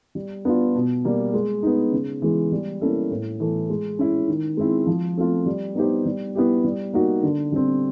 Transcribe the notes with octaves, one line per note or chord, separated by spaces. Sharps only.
G3
B3 D4 F4
B2
G3 A#3
G#3
B3 D#4
C#3
E3 G#3
G3
A#3 C#4 E4 A4
A2
E3 A3
G#3
C#4 E4
D#3
G#3 C4 E4
F3
A3 C4 F4
G3
B3 D#4 G4 C5
G3
B3 E4 G4
G3
A#3 D#4 F#4
D3
G3 C4